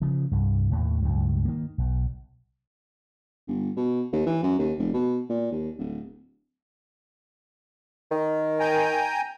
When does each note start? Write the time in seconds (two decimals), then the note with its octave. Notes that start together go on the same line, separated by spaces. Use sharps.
0.02 C#3 F3
0.31 C2 G2
0.71 D#2 A2
1.02 C#2 G2 F#3
1.45 D#3 A#3
1.78 B1
3.47 G1
3.77 B2
4.13 D#2
4.26 E3
4.43 F#2
4.59 D#2
4.78 F1
4.93 B2
5.29 A#2
5.51 D#2
5.79 D1
8.11 D#3
8.60 G5 G#5 A#5